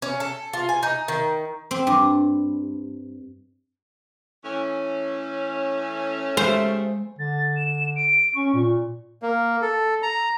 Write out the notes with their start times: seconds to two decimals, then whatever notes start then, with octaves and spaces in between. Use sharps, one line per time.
0.02 C#4
0.20 A4
0.53 F4
0.69 G#5
0.83 D#4
1.08 D#3
1.71 C4
1.87 G2
4.44 E3 A3 C#4
6.37 D#2 C#3 G#3 A3 C5
7.19 D3 A6
7.56 E7
7.96 D7
8.35 C#4 C#6
8.54 A#2
9.22 A#3
9.62 A4
10.03 A#5